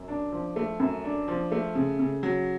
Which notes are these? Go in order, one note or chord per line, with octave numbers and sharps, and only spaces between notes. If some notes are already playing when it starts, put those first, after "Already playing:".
Already playing: F#2
D4
F3
A3
F#2
D4
F3
A3
C#3
C#3
F#3